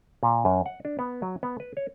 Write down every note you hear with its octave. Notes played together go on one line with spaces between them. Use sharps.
A#2
F#2
F#5
D4
B3
F#3
B3
B4
C#5